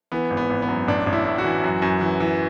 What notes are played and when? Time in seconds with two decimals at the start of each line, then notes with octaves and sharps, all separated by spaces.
0.12 E3 B3
0.30 G#1
0.37 B3
0.50 G#1
0.62 B3
0.68 F#2
0.88 A1 D4
1.06 A1
1.13 E4
1.25 A2
1.38 F#4
1.44 E3
1.64 F#2
1.82 F#2
2.01 E3
2.20 E3